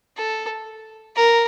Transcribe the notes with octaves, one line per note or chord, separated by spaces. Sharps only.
A4
A#4